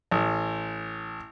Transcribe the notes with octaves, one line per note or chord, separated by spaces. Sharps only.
A1